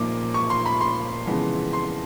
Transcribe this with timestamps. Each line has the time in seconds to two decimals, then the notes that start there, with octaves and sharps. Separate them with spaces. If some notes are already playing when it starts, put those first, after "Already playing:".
Already playing: A#2 F3 A#3 D#4 D6
0.34 C#6
0.50 C6
0.66 B5
0.81 C6
1.27 F2 C#3 E3 G#3 B3
1.73 C6